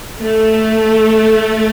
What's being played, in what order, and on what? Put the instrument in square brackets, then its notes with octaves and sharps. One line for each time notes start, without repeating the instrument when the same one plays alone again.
[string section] A3